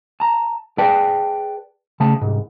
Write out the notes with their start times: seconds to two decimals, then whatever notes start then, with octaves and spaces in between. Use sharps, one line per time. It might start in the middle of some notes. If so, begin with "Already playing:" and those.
0.20 A5 A#5
0.78 G#4 B4 D5 G5 A5
2.00 C#3 A3 A5
2.22 C2 G#2